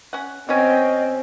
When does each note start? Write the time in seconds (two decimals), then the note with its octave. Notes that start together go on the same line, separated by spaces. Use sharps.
0.13 C#4 F#5
0.49 B2 C4 C#4 D#5